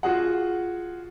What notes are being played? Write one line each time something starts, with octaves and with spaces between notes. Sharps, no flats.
F4 F#4 G#4 F#5